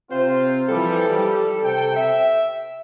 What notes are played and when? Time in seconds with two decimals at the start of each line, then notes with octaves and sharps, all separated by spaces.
0.11 C3 C4 F4 C5
0.69 E3 F3 G3 A4
1.09 G3
1.63 C3 G5
1.96 E5